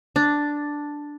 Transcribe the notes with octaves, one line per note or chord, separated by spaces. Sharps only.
D4